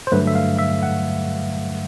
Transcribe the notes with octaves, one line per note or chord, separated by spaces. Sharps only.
C5
G2 D3 F#3 A3 B4
E5
F5
E5
F#5